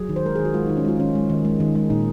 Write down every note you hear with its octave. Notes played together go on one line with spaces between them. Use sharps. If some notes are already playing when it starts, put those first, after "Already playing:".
Already playing: F#3 G#4
D#3
C5
G#3 A#4
D#3 G#4
F#4
G#3 F4
D#3 D#4
C#4
G#3 F4
D#3 C#4
G#3
D#3
G#3
D#3
G#3
A#2 D#4